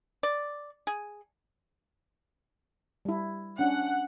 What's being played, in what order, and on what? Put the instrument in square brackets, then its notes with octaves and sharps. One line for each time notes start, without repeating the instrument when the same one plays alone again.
[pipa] D5
G#4
[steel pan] G3 E4
[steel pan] C#4 D4 [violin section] F#5